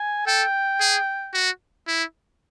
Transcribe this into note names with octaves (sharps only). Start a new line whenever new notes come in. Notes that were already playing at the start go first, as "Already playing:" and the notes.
Already playing: G#5
A4 G5
G#4
F#4
E4